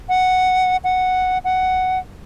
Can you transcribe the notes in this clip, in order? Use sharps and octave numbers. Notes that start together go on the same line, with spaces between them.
F#5
F#5
F#5